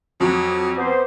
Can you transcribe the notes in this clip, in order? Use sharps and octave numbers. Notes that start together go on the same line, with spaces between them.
F2 F#3
B3 G4 C5